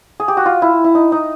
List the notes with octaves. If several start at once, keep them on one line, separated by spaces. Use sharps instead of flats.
G#4
G4
F#4
F4
E4
E4
D#4
D#4